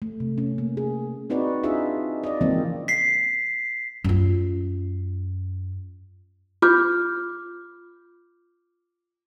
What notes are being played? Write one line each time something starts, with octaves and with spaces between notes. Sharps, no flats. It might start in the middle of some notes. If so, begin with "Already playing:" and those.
A3
C3
C#4
A#3
G#4
C4 D#4 F#4 B4 D5
D4 D#4 F4 G#4 E5
D5 D#5
C#3 E3 F3 G#3 A#3 C4
B6 C7
F#2 F4
F4 D6 F6 G6